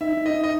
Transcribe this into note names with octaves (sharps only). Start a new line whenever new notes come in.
D#4 E5
D#4
D#5
D#4
D#5